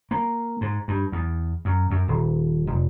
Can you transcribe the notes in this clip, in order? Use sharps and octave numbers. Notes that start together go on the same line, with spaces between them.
A#3
G#2
G2
E2
F#2
F#2
D#1
F1